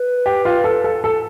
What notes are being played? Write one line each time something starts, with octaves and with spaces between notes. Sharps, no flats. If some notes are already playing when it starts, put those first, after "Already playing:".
Already playing: B4
G4
F4
A4
A4
A4